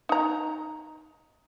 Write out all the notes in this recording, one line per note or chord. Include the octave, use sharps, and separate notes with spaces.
D#4 A#5